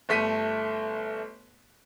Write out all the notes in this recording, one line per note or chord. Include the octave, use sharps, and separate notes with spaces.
G1 A3 B6 D#7